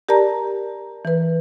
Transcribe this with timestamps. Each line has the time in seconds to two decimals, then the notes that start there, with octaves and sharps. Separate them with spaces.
0.09 G4 A#4 D5 A5 A#5
1.05 E3 B4